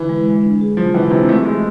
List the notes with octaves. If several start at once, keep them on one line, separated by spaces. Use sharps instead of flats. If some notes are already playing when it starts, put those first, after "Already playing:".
Already playing: D3 E3
G#3
G#3
D4
G#4
C3 F3
E3 G#3
C3 D4
E3 A3
G#3 A3